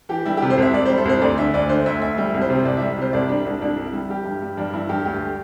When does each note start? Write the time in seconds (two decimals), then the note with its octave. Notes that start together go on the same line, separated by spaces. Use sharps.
0.09 E3 G4
0.26 G3 E4
0.37 C3 G4
0.50 C5
0.58 C2 E5
0.74 C2 D5
0.86 G3 C5
0.98 A4
1.05 C2 C5
1.22 D2 D5
1.37 D3 E5
1.54 D2 D5
1.69 D3 C5
1.86 D2 E5
2.02 D2 E5
2.18 G3 E5
2.34 C2
2.41 C5
2.50 C3
2.65 C2 D5
2.77 G3 E5
2.98 C3 C5
3.13 C2 D5
3.29 G3 D4
3.45 C2 D4
3.61 C2 D4
3.77 C2
3.86 E4
3.93 G3
4.09 G3 G4
4.25 G2
4.42 G3
4.57 G2 D4
4.73 G2 E4
4.89 G2 G4
5.05 D2 G4